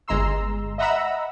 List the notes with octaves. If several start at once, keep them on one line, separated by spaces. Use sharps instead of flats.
G1 G#3 A#5 C6 E6
D#5 E5 F#5 A#5 B5 E6